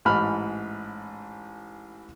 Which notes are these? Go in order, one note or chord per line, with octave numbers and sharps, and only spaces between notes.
A1 G#2 B5 F6